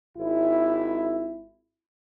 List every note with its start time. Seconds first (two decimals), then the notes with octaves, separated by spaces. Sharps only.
0.18 G#1 E4